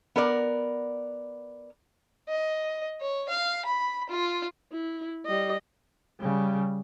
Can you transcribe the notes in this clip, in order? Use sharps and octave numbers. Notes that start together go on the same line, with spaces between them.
B3 A#4 D5
D#5
C#5
F5
B5
F4
E4
G3 D#5
C#3 G3